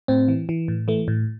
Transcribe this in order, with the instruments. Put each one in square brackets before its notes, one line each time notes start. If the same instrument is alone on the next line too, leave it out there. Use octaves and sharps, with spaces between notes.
[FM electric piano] A2 C4
E3
E3
A2
E3 A3
A2